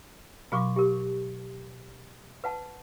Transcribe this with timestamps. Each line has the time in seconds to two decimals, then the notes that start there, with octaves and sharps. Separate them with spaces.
0.52 B2 F#3 F#4 C#6 D6
0.76 G4 A#4
2.44 B4 F#5 A5